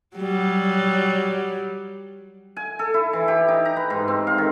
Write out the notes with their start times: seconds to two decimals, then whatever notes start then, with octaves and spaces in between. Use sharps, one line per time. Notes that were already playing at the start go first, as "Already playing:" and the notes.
0.16 F#3 G3
2.56 G#5
2.79 A4
2.94 E4
3.13 E3
3.28 G4
3.48 D#4
3.65 A#5
3.77 B4
3.90 G#2
4.08 C4
4.27 F5
4.38 D#3